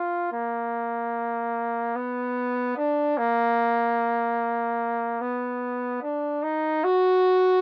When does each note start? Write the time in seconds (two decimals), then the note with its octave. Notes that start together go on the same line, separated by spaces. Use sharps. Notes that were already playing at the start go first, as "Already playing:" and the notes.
Already playing: F4
0.32 A#3
1.95 B3
2.77 D4
3.18 A#3
5.21 B3
6.03 D4
6.43 D#4
6.84 F#4